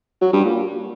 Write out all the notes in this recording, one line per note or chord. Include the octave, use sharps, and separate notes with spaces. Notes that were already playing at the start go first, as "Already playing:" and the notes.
F#3
G2
A#2